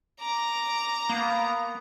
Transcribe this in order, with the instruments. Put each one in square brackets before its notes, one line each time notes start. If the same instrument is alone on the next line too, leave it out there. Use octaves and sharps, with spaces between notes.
[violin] A#5 [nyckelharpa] D6
[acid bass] A#3 [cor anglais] B3